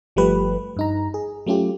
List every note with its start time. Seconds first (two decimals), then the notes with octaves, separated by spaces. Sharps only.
0.16 G1 F3 G3 A3 G4 B4
0.77 G2 D#4 A#5
1.14 G#4
1.46 F#3 A3 C#4 F4 G4